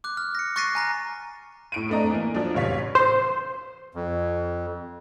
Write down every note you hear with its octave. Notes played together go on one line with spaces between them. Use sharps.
D6 F#6
F6
A#6 C#7
C#6 F#6 A6 A#6 C7 D#7
G#5 A#5 A#6
A2 D7 D#7
A3 C4 D4 D#5 A#5
E3 A#3
F3 F#3 D4
A1 C3 C#5 F5 B6
C5
F2